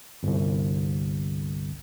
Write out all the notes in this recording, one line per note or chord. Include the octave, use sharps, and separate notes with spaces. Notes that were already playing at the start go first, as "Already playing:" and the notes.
G1 C2